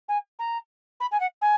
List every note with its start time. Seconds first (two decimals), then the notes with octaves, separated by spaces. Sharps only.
0.08 G#5
0.39 A#5
1.00 B5
1.11 G#5
1.20 F#5
1.41 G#5